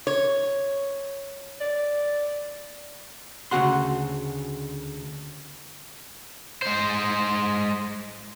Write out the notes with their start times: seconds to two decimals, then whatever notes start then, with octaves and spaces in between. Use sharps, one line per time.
0.07 C#5
1.60 D5
3.51 D2 C#3 D4 F#4 F#5 C6
6.62 G#3 C5